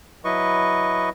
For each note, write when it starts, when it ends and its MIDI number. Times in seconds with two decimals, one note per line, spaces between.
0.25 1.09 54
0.25 1.09 64
0.25 1.09 71
0.25 1.09 75
0.25 1.09 85